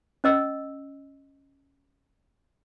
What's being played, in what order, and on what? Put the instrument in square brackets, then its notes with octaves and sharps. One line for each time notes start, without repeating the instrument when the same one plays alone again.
[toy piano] C#4 D#5 E6